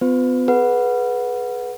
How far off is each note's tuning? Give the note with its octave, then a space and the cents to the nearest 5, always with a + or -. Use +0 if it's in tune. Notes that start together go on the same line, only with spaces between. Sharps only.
B3 +40 F4 +25 B4 +40
G#4 +30 B4 -10 F#5 -15